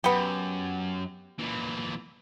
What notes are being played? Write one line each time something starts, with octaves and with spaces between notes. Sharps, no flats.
F#2 B3 G4
A#2 E3